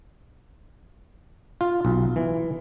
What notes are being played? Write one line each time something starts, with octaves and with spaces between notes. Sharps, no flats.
F4
B1
E3